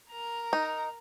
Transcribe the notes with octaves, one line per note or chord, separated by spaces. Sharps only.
A#4 A#5
D#4